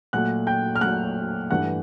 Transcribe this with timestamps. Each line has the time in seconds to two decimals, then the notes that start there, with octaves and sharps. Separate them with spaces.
0.13 A#2 F#3 A3 F#5 F#6
0.47 G5 G6
0.76 F6
0.81 A#2 F#3 A3 F#5 F#6
1.50 G2 E3 A3 F#5 F#6